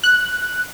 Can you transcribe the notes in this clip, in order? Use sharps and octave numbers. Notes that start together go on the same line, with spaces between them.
F#6